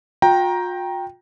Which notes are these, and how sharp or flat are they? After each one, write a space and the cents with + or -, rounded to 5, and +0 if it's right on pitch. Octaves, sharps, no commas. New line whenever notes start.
F4 +45 G5 +0 A#5 +10